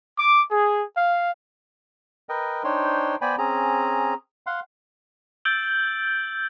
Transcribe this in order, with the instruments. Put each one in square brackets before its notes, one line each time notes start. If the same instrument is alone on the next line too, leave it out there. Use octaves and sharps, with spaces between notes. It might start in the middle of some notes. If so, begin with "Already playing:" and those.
[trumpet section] D6
G#4
F5
[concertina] A#4 B4 D#5 G5
D4 D#4 C5 C#5 G5 C6
B3 C5 D5 G5 G#5 B5
C4 C#4 G#4 A#5
F5 F#5 C6
[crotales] E6 G6 A6 D7 F#7 G7